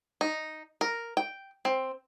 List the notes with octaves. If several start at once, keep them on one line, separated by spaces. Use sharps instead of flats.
D#4
A#4
G5
C4